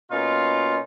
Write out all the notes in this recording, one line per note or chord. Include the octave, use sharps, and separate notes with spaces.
B2 A#3 C#4 D#4 F4